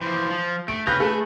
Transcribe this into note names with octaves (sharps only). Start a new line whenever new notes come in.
E3 F3 C5
F3
A3 D7
C#3 B4 F5 G6 A#6
A3 G#4 A4